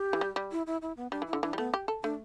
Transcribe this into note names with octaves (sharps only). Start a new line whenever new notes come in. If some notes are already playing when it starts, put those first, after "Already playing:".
Already playing: G4
E3
G3
G3
E4
E4
E4
B3
G3 D4
E3
E4
D3
E3 D4
G3
A3 B3
G4
A4
A3 D4